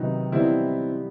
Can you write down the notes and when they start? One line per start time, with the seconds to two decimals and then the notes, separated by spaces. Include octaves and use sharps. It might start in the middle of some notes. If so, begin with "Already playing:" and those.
Already playing: C3 D#3 F#3 B3 D#4
0.32 E3 G3 B3 C4 D#4 E4